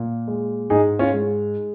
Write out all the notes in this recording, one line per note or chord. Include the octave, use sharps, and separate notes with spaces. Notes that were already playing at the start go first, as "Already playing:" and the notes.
Already playing: A#2
G#3
G#2 D#4 G#4
C#4 F4
G#3